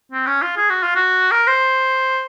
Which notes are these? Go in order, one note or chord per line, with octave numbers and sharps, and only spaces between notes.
C4
C#4
F4
G#4
F#4
F4
F#4
A#4
C5